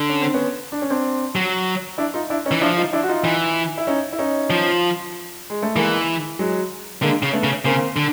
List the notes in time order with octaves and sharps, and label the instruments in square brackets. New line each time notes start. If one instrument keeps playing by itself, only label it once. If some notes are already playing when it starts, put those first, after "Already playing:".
Already playing: [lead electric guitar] D3
[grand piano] C#4
C4
B3 C#4
D4
C#4
C4 D4
[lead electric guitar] F#3
[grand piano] D4 E4
D#4 F4
D4 E4
C#4 D#4
[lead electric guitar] E3
[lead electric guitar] F3 [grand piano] D4 E4
[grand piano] D#4 F4
D4 E4
F#4
D#4 F4
[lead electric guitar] E3
[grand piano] E4
C#4 D#4
E4
C#4 D#4
[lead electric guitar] F3
[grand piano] G#3
A3
[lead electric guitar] E3 [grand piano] G#3 A#3
[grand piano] F#3 G#3
[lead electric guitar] D3 [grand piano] G#3 A#3
[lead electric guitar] C#3
[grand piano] A3 B3
[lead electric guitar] C#3
[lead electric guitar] C#3 [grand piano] A#3 C4
[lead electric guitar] D3